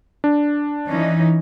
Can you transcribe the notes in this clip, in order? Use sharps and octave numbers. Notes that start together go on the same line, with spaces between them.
D4
E3 C#4 D#4